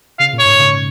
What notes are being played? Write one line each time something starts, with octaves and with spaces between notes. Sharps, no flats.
C#3 F5
A#2
C#5
G#2
C#3